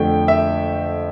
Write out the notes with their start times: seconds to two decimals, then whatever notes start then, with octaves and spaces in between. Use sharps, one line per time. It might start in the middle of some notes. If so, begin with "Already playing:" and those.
Already playing: F2 D3 A3 G5
0.28 E5